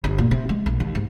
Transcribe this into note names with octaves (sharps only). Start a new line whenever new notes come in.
G1
A#2
C3
G#3
B1
D#2
G#2